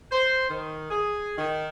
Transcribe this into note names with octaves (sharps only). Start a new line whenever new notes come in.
C5
D#3
G#4
D#3